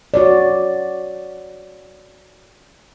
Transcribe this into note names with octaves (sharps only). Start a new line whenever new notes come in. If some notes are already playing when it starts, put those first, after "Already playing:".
F#4 C#5 D5